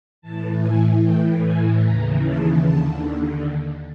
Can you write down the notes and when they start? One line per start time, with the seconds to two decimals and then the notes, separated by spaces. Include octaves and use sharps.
0.22 A2 E3 A5
0.62 G#5
1.02 A2 E3 G5
1.43 G#5
1.82 D#2 C#3 E3 A#5
2.23 A5
2.64 D#2 D3 A5